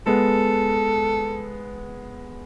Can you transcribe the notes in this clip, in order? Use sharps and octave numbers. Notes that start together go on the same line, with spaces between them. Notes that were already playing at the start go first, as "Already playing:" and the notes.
G#3 B3 A4